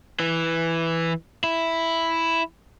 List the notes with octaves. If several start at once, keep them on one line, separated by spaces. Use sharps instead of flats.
E3
E4